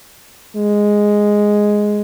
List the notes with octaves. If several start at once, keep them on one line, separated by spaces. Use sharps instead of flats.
G#3